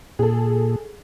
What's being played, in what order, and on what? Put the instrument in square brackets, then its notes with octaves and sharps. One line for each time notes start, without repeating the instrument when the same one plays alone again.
[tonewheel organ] A#2 [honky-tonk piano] G#4 A4